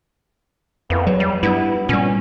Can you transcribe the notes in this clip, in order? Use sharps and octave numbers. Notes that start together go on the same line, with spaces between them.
F2 E3 A#3 B3
E2 F#3
G3
G2 B3 E4
A#2 G3 C#4